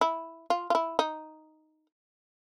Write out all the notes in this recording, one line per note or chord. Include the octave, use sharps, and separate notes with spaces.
E4
F4
F4
E4
D#4